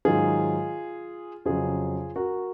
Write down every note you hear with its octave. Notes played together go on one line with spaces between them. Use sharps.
G#2 D#3 F#3 F4 G#4
F2 C#3 F#3 F4 G#4
F#4 A#4